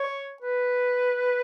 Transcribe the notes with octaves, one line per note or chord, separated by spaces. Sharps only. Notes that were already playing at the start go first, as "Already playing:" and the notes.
Already playing: C#5
B4